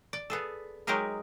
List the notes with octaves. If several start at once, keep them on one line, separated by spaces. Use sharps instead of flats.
D5
B3 G#4 A4
F#3 G#3 D#4 G4 G#4 A#4